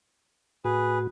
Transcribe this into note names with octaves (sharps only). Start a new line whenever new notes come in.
A2 F#4 G#4 B4